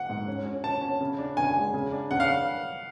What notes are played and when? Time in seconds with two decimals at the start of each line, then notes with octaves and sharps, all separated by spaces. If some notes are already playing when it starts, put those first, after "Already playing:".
Already playing: F#5
0.09 G#2
0.28 C#4
0.46 C#4
0.63 C#4 A5
0.82 C#4
1.01 C#3
1.19 D4
1.37 C#3 G#5
1.56 G#3
1.74 C#3
1.92 D4
2.11 C#3 F#5
2.20 F5